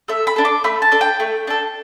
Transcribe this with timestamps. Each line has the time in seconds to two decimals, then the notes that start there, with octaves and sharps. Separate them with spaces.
0.08 A3 E5
0.27 B5
0.36 D4 A4
0.45 D6
0.64 A3 B5
0.82 A5
0.91 D4 A4
1.01 G5
1.20 A3
1.47 D4 A4